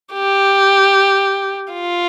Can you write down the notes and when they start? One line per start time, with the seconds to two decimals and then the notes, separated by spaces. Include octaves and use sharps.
0.13 G4
1.73 F4